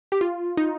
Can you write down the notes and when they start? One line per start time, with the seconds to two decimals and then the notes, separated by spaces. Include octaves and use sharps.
0.12 G4
0.21 F4
0.57 D#4